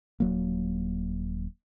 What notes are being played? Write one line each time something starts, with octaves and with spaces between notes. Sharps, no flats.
D#1 F#3 A#3